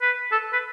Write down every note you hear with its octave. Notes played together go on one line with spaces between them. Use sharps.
B4
A4
B4